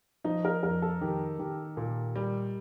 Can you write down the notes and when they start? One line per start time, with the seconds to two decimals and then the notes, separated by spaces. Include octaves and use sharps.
0.25 F3 D#4
0.45 A#4
0.63 F2 A#4
0.82 A4
1.01 D#3 G4
1.39 D#3 G4
1.77 A#2
2.16 G3